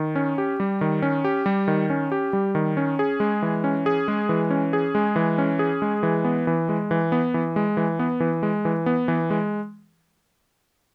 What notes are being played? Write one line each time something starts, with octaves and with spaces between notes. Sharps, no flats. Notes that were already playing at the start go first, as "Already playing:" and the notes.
Already playing: D#3
C#4
G4
G3
D#3
C#4
G4
G3
D#3
C#4
G4
G3
D#3
C#4
G#4
G#3
E3
C#4
G#4
G#3
E3
C#4
G#4
G#3
E3
C#4
G#4
G#3
E3
B3
E3
G#3
E3
B3
E3
G#3
E3
B3
E3
G#3
E3
B3
E3
G#3